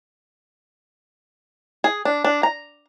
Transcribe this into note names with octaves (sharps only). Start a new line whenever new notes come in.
G#4
D4
D4
A#5